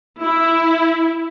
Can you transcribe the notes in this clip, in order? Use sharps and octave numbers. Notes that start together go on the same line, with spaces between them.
E4